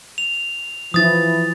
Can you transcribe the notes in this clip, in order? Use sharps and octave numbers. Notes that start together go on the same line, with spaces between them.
F7
E3 F3 E4 D#6 A6